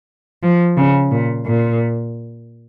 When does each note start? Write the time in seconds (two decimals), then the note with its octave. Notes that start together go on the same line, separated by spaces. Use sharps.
0.43 F3
0.77 C#3
1.11 A#2
1.45 A#2